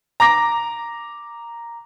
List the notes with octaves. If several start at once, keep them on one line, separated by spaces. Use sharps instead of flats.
A#5 D6 A#6